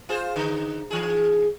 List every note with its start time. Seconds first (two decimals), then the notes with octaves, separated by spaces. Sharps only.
0.09 F4 G#4 C5
0.36 D3 D#4
0.90 E3 G#4